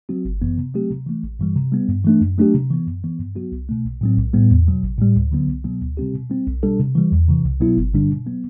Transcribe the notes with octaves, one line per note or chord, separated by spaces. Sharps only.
F#3 C4 F#4
G1
F#2 E3 B3
C3
F#3 A3 C4 G4
C3
E3 A3
A1
G2 E3 G3
C3
G3 B3
G2
E3 A3 D4
F#2
F#3 A3 D4 G4
C3
E3 B3
F#2
E3 B3
G2
F#3 B3 F#4
C2
B2 A3
B1
A2 F#3 C4
B1
A2 G3 B3
E2
B2 F#3
A1
A2 G3
D2
D3 F#3 B3
C2
B2 F#3 B3
D2
C3 G3 C4 G4
B2
G3 C4
B1
B2 G3 D4 A4
C3
E3 G3
E2
C3 E3
C2
B2 F#3 B3 E4
G1
G2 D3 G3 D4
B2
F#3 B3